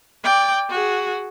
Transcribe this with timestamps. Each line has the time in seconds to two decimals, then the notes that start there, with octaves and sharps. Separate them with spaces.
0.24 D5 G5
0.70 F#4 G#4